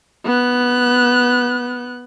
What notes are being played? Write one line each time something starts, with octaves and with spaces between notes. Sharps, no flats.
B3 F#6